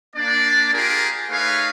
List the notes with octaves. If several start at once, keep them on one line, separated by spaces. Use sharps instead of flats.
A#3 D4 D5
F4 G4 G#4 A#4
A3 D#4 G#4 B4 C#5 F5